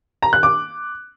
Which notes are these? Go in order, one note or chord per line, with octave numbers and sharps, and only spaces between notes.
A#5
F#6
D6